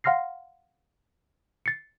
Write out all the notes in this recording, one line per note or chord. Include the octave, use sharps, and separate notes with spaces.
F5 F#5 C6 F6 A#6 C7
A6 C7 C#7